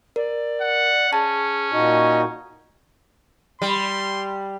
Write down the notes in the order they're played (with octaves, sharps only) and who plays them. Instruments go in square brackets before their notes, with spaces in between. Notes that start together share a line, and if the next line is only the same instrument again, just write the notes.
[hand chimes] A#4 [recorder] D5
[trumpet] F#5
[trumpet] C#4 [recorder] G#4 [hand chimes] A5
[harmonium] A#2 D#4 F#4 [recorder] D#5
[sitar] G3 [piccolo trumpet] C6